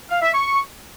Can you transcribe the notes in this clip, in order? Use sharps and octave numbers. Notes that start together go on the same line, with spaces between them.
F5
E5
C#6